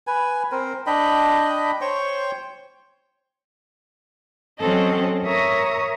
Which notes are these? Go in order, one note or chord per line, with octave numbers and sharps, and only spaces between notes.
B4 G#5
C4 A#4 C5
D4 D#5 G5 B5
C5 C#5 G5 C#6
F#3 C4 C#4 A4 D#5
A#4 C#5 E5 A#5 C#6 D#6